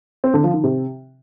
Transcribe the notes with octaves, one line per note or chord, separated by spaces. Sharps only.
C4
D3
F3
D#3
C3